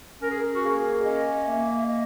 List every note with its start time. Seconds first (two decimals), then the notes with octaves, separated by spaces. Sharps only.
0.22 C#4 A#4
0.30 G#4
0.39 A#4
0.53 F#4
0.63 A#3 G#4
1.04 C#4 D#5
1.46 A#3 E5
1.87 D#5